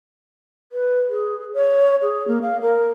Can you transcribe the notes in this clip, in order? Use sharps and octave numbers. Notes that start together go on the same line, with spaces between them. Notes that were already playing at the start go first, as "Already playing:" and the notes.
B4
G#4
C#5
G#4
A#3
F5
A#4